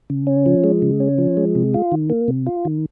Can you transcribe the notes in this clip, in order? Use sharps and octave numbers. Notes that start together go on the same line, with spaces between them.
C#3
C#4
F3
G#3
C#3
C#4
F3
G#3
C3
F4
D#3
A#3
C3
F4
D#3